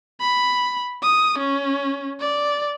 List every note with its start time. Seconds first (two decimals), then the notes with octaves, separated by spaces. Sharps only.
0.20 B5
1.03 D#6
1.38 C#4
2.20 D5